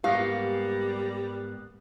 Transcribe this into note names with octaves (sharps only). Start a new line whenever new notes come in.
G#2 G3 A#3 B3 G4 F5